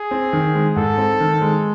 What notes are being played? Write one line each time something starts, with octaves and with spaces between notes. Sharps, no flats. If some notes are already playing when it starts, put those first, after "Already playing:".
Already playing: G#4
C4
D#3
G#3
G#2 A4
C4
D#3
G#3